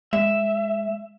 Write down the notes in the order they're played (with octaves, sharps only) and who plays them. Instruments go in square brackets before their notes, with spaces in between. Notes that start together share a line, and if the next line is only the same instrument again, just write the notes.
[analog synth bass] G#3 [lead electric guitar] E5